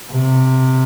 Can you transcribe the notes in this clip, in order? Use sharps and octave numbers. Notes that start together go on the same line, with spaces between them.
C3